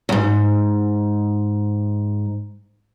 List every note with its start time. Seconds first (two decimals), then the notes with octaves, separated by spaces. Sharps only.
0.09 E2 G#2